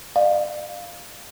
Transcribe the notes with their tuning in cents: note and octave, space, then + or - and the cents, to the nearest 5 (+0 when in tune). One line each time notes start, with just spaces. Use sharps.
D5 +40 F5 +0